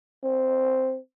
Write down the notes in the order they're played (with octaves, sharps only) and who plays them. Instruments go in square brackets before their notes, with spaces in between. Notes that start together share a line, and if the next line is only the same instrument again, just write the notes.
[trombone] C4